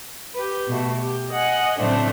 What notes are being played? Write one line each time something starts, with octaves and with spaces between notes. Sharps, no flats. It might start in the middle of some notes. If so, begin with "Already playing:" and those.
G4 B4
B2 A3 F#4
G4
D#5 F#5 G#5
A2 C#3 F#3 A3 C4 D4